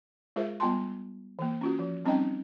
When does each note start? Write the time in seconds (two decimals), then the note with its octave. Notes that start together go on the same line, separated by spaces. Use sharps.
0.36 G#3 F4 G#4 A#4 C5 E5
0.60 G3 B3 F4 G5 A5 C6
1.39 E3 A#3
1.61 C#4 F4 F#4
1.79 F3
2.05 G3 C4 C#4 D#4 D#5 G5